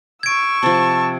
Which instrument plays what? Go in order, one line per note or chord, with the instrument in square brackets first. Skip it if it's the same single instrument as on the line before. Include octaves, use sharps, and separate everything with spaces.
[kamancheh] C#6 E6 [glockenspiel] G#6 D7
[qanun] C3 F3 [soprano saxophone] A5